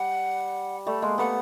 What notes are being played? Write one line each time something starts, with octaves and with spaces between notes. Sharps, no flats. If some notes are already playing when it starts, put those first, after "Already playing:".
Already playing: G3 F#5
G3 A3
G#3 A#3
A3 B3 F#5